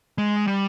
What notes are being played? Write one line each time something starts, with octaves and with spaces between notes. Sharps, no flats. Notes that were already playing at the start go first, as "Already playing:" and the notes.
G#3
G3